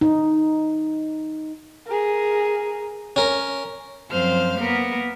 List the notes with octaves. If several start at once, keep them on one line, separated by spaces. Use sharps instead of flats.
D#4
G#4 A#4
C#4 A#4
F#2 F3 C4 C5 F5 F6
A#3 B3 A#4